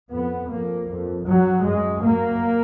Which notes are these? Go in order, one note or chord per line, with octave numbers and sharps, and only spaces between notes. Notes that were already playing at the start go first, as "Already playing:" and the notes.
F2 B3
F2 A#3
F2
F#2 F#3
F#2 G#3
F#2 A#3